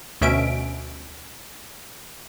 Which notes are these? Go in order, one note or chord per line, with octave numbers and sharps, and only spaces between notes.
D2 B2 C#4 E5 D7